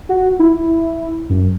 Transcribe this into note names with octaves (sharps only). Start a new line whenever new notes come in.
F#4
E4
F#2